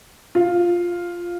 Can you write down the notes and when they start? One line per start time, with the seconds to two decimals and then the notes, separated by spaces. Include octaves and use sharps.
0.35 F4